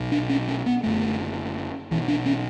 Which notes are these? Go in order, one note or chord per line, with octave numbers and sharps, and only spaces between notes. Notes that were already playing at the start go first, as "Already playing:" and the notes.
Already playing: B1 B2
D4
C#4
C#4
B3
F#1 F#2 D3 A3
B1 B2 E3
D4
C#4